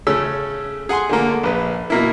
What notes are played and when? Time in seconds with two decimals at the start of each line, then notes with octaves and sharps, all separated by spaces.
0.07 C#3 A3 C#4 E6
0.89 G#4 F#5 G#5 C6
1.09 D3 A3 A#3
1.43 A#1 B4
1.90 B2 A#3 E4